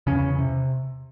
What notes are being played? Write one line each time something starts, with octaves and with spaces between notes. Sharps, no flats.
E2 C#3 C#4
C3